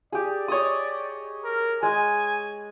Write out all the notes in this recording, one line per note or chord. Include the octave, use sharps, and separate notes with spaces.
G4 G#4 D5
C#5 D#5 D#6
A#4
G#3 G#5